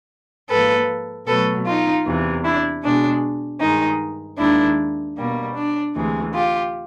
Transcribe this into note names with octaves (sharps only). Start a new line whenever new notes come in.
G#2 F3 A#3 A4 B4
B2 F#3 A3 A4 B4
D#4 F4
E2 C3 E3
D4 E4
B2 G#3 D4
G2 D#3 G#3 D#4
D#2 D#3 G#3 D4 E4
B2 G3 A#3
D4
D2 C3 E3 G#3
F4 G4